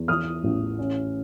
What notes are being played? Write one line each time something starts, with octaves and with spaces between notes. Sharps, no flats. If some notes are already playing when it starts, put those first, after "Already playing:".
Already playing: E2
E3 D#6 F6
A1
C#4